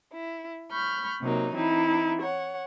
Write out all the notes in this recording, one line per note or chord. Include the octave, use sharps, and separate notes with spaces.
E4
B5 C#6 F6 G6
C3 F#3 A#3 D#4
E3 C4 D#4 E4
C#5 F#5